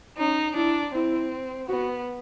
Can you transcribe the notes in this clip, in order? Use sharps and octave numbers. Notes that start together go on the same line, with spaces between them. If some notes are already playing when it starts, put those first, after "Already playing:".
C#4 D#4
D4 E4
C4 E4
B3 F#4